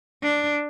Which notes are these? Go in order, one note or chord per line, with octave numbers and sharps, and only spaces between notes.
D4